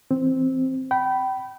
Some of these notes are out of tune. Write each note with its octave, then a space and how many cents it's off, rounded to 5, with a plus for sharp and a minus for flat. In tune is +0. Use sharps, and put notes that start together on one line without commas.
E3 +5 C4 +0
G5 -30 B5 +0